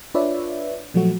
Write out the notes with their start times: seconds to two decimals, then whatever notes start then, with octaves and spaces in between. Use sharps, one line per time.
0.14 D4 F4 B4 C#5 D5 E5
0.94 A#2 F3 F#3 A3 F#4